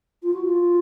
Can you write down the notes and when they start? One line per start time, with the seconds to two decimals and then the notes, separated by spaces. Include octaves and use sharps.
0.23 F4
0.34 F#4
0.44 F4